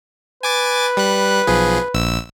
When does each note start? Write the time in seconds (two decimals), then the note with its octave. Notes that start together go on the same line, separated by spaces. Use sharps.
0.43 B4 G#5 D6 A6
0.97 G3 F#6
1.47 B1 F3 G#4
1.94 A#1 E6